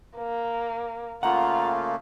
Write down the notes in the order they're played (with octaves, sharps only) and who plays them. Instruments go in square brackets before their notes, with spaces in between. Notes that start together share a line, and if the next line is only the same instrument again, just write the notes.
[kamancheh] A#3
[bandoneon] C#3 A3 A#3 [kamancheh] F4 [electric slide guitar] F#5 [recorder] A#5